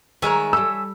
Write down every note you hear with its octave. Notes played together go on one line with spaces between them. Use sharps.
D#3 G#3 A#4 C#5 E5 G#5
G3 A4 E6